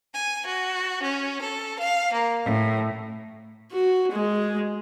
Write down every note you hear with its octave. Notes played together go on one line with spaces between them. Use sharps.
G#5
F#4
C#4
A4
F5
A#3
A2
F#4
G#3